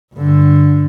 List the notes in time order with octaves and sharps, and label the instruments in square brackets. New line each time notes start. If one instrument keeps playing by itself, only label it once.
[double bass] G2 D3